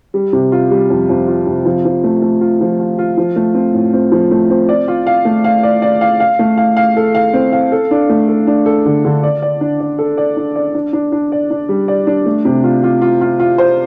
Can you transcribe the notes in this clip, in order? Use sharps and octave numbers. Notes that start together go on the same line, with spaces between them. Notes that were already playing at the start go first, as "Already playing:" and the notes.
G3
C3
F4
G3
F2
F2
F4
C3
F3
F3
A3
A3
F4
F3
F4
F4
F3
A3
C4
A2
C4
F3
A3
C4
D5
F4
F5
A3
F5
D5
D5
F5
F5
A3
F5
F5
A4
F5
C4
F5
A4
D4
A3
A4
D4
A4
D3
D3
D5
D5
D4
D5
A4
D5
D4
D5
D4
D4
D4
D5
D4
G3
D5
D4
A3
C3
F4
F4
F4
F4
F4
C5